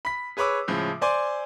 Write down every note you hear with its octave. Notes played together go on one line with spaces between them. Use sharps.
B5 B6
G#4 B4 C#5 B5 D6 E6
A2 C#3 F3 G#3
C5 D5 G#5 C6